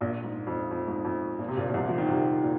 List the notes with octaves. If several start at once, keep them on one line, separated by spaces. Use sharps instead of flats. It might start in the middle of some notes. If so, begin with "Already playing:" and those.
A#1 A#2
G#2
F2
F2
G#2
F2
A#2
C3
A#1 A#2
A#2
C2 C3
F3
D#3
C2 C3
A#2